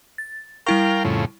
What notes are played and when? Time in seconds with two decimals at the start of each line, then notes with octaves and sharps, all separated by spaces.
0.18 A6
0.66 G3 E4 A#4 F5 G5 C#6
1.04 F2 A2 C#3